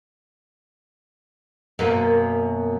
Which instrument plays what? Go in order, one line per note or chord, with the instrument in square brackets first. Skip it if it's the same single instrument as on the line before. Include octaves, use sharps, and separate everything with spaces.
[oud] F#2 B2 A#3